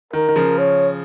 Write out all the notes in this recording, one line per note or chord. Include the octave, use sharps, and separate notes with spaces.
D#3 A#4
D#3
C#3 F3
C#5